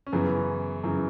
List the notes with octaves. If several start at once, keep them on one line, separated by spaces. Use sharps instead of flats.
C#4
F#2 C#3 E3 B3
F#2 C#3 E3